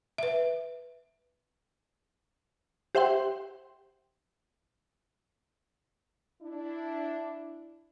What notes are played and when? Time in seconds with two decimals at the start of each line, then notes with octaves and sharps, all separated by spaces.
0.18 B4 E5
2.95 G4 C5 E5 F#5 G5 C6
6.42 D4 E4